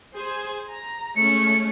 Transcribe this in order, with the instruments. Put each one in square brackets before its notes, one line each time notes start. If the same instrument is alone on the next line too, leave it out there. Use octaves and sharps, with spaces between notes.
[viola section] G#4 C5 G#5
A#5
[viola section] G#3 A3 C#4 [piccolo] C#7